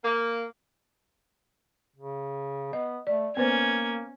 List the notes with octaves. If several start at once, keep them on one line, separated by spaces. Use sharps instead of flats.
A#3
C#3
B3 D#5
A3 D5
A#3 B3 C#4 B4 C5 G#6